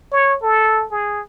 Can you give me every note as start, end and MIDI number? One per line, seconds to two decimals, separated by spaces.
0.12 0.37 73
0.43 0.86 69
0.92 1.22 68